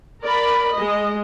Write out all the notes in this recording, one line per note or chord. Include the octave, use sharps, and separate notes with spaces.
A#4 D5 B5
G#3 D#5